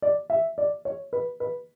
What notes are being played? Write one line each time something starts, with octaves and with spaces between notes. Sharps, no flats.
D5
E5
D5
C#5
B4
B4